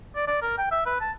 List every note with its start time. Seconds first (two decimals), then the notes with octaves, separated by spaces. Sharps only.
0.16 D5
0.27 D5
0.42 A#4
0.58 G5
0.71 E5
0.86 B4
1.01 A5